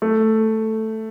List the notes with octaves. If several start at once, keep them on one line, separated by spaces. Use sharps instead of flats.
A3